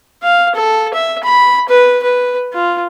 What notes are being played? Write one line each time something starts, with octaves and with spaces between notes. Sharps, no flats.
F5
A4
E5
B5
B4
B4
F4